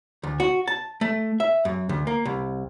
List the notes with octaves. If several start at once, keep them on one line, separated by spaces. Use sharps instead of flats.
D2
F#4
A5
A3
E5
F#2
D2
A#3
C2